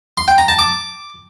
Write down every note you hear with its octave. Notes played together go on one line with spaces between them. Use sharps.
C6
G5
A#5
A5
D6